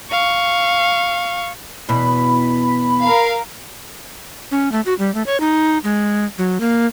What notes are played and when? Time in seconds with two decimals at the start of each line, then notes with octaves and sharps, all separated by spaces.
0.11 F5 C#6
1.89 E2 B2 B5
3.03 A#4 F5
4.51 C#4
4.72 A3
4.86 F#4
4.99 G3
5.14 A3
5.26 C#5
5.40 D#4
5.84 G#3
6.38 F#3
6.60 A#3